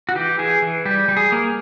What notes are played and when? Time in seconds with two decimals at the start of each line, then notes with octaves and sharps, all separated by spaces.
0.09 F#4
0.15 E3 G4
0.39 E3 G#4
0.62 E3
0.85 G3 G4
1.08 G3
1.17 G#4
1.32 A#3